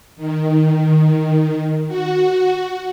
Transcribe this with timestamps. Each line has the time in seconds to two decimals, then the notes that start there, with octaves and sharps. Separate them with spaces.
0.17 D#3
1.88 F#4